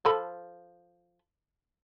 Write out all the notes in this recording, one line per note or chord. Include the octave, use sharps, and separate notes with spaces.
F3 A4 B5